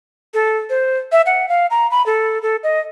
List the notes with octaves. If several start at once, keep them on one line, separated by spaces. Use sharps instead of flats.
A4
C5
E5
F#5
F5
A#5
B5
A4
A4
D#5